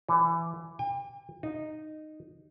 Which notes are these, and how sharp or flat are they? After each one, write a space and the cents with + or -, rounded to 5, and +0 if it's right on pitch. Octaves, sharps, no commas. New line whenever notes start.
E3 +20
G5 +45
D#4 -10